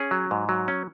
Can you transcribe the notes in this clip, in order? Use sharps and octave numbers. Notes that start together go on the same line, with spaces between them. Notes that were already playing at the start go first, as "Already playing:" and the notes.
Already playing: C#4 G#4
F#3
G#2
F#3
C#4